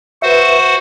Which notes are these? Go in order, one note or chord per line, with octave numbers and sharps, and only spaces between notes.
F#4 B4 C5 E5 F#5